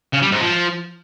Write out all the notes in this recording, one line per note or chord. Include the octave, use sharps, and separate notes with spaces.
C#3
G3
G#2
F3